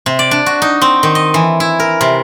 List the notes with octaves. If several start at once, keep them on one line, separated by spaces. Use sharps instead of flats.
C3
D5
D4
F#4
D#4
C4
D#3
D#5
E3
E4
A#4
C3